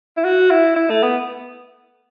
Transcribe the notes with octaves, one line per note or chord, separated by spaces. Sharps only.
E4
F#4
E4
E4
A3
B3